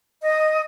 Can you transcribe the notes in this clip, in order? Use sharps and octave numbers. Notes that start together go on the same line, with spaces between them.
D#5